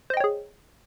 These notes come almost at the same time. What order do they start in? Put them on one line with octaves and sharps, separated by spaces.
C5 D#5 G5 C#5 G#4